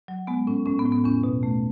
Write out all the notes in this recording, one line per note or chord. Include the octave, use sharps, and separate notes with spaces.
F#3
G#3 B3
A2 C#4
A2 C#4
B3
A2
B3
E2 C#4
B2
A3